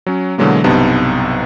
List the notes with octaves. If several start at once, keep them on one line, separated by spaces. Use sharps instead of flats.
F#3 C#4
B2 D3 E3 F#3 G#3 A#3
B1 G2 C3 B3 D#4 A5